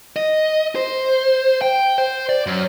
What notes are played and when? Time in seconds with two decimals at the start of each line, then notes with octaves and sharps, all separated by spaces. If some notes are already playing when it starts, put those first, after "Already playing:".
0.16 D#5
0.76 C5
1.62 G5
1.98 C5
2.29 D5
2.46 F#2